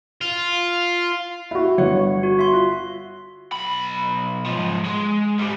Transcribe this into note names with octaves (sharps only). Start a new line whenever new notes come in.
F4
E4 F#4
G1 F#4 C#5 F#5
F#4
E5 C6
F4
B1 B5
G#2 F3
G#3
G#2 G3